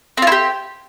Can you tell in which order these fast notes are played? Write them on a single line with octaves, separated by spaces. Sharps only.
C4 F4 E4 G4